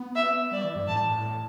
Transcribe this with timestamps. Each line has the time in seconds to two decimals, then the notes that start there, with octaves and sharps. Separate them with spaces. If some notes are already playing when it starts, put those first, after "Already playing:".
Already playing: B3
0.16 E5
0.52 G3 D5
0.64 E3
0.76 G2
0.87 A2 A5